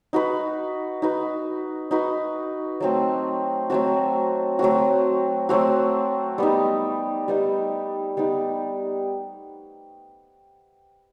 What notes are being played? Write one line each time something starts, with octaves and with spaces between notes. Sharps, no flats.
D#4 F#4 B4
D#4 F#4 B4
D#4 F#4 B4
F#3 A3 C4 F#4
F#3 A3 C4 F#4
F#3 A3 C4 F#4
F#3 A3 C4 F#4
G3 B3 D#4
G3 B3 D#4
G3 B3 D#4